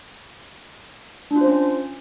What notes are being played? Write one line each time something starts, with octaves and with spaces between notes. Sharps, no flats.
D4
F4
C5
C#4